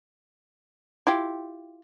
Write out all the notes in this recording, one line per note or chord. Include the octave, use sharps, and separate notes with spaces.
E4 F4 G4